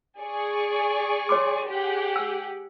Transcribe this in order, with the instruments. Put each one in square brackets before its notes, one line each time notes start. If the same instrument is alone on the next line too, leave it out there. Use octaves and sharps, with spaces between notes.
[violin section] G#4 D5 C#6
[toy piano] C#5 C6 D6
[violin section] G4 G#4 F#5
[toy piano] E6